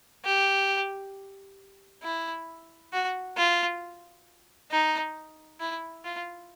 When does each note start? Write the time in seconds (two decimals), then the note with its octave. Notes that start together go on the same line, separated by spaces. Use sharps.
0.25 G4
2.03 E4
2.93 F#4
3.37 F4
4.71 D#4
5.60 E4
6.05 F4